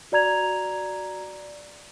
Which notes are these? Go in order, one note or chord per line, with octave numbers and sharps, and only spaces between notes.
F#4 D5 A#5 G#6 F7